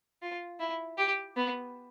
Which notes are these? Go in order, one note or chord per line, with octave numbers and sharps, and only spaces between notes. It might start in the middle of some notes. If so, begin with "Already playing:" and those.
F4
E4
G4
B3